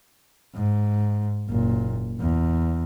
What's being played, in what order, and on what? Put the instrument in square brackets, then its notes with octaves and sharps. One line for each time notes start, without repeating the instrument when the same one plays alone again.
[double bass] G#2
F#1 A#2
E2